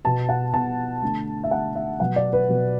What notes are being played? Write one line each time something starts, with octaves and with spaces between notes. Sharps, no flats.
B2 B3 A5
F#5
B2 B3 A5
D3 A3
E5
D3 A3 F#5
E5
B2 F#3 B3 F#5
D5
B4
B2 F#3 B3